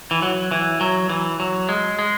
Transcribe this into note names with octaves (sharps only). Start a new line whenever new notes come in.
E3
F#3
E3
F#3
E3
F#3
G#3
G#3